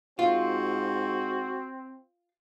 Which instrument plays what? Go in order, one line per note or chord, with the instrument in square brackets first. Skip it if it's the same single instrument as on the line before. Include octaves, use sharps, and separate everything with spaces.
[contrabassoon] G#2 [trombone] C4 [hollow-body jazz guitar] F4 [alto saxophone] F#4